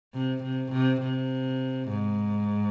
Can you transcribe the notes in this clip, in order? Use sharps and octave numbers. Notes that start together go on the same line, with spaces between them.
C3
C3
C3
C3
G#2